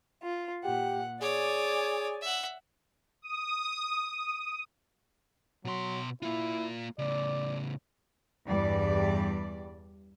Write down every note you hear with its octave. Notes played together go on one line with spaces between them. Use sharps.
F4
A#2 G4 F#5
G#4 C#5 D5 G#5 D6
E5 F#5
D#6
B2 F#3 C6
A#3 E4 F4
A2 C#3 D5
E2 G2 G3 D5